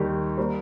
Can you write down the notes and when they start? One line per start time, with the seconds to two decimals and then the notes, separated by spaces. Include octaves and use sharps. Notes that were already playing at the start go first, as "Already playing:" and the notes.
Already playing: D#2 D#3 G3 G4
0.38 G3 A#3 C5